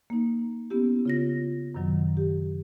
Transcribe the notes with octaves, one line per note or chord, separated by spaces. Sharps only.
A#3 D#4
B3 C#4 E4 G4
C#3 F4 A#6
F#2 C3 D#3 F#3
G4